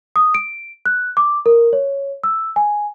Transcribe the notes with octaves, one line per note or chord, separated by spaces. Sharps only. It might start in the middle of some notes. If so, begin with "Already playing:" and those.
D#6
D7
F#6
D6
A#4
C#5
E6
G#5